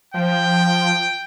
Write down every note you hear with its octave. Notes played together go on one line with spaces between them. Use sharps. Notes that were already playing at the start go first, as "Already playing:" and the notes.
F3 G5